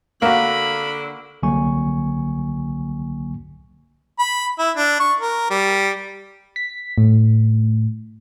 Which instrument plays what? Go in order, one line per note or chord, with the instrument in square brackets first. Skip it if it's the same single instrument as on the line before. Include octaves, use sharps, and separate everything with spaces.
[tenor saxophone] D3 [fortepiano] A#3 F#4 [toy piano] F5 [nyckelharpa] B5
[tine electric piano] C2 D3 F#3 A#3 G#5 C#6
[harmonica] B5
E4
D4
C#6
A#4
G3
[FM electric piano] B6
A2